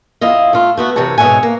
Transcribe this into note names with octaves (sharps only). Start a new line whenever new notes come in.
F2 E4 F4 D#5
A3 F4
A3 B3 F#4
F#2 C3 E3 A#4 C#5 A5
G#2 B2 C#5 E5 F#5 G#5
A#3